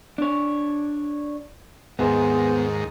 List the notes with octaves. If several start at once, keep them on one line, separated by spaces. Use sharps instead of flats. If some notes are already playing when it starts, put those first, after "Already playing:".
D4 C#5
D#2 G#2 B3 G#4 C5